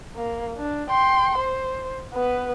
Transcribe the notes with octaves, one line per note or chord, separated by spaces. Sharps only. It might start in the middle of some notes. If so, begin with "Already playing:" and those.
A#3
D4
G5 C6
C5
B3 B4